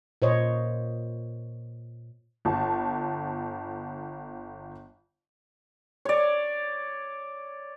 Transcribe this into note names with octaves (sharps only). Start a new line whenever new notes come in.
A#2 C5 C#5 D#5
G1 A5
C#5 D5